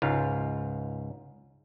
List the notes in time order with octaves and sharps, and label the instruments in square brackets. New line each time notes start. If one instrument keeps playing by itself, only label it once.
[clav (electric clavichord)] C#2 G#2 F4 F5